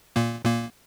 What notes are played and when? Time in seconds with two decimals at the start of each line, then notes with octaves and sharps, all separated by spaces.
0.16 A#2 A#3
0.44 A#2 A#3